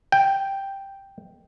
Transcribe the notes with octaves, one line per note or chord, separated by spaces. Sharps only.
G5